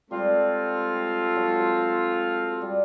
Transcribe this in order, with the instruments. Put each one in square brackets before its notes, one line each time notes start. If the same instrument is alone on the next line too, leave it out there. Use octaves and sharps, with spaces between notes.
[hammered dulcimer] G3 [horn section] G#3 C4 F4 A4
[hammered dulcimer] F#3
G3